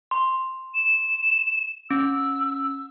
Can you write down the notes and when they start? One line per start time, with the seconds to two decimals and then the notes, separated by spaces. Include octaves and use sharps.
0.11 C6
0.75 E7
1.91 C#4 E6